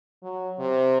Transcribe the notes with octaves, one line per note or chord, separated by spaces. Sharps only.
F#3
C3